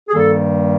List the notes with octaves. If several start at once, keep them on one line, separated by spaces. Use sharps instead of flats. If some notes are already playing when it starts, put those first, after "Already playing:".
G#4
G2 D#3 G3 A#3 A4